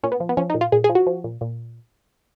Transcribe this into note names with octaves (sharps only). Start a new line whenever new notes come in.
A#2 C#4
B3
F3
B3
F3 C#4
D#4
A#2
F4
A#2 G#4
G#4
F3
F#4
F3
A#2
A#2